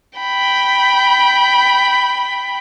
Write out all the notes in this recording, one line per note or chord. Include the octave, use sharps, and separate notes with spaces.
G5 B5